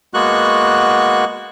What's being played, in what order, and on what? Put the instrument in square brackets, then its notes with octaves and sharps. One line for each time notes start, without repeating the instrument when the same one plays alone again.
[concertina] G#3 A#3 B3 F#4 C#6 F#6